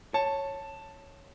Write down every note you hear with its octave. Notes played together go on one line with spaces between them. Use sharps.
C#5 A5